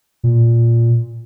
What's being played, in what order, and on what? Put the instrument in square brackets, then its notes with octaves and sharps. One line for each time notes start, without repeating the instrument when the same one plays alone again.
[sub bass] A#2